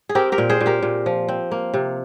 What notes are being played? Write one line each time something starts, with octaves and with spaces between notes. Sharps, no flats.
G#4
C4 G4 A#4
G4 A#4
A#2
G#4 C5
A#2
G4 A#4
A#2
F3
C4
A#3
C3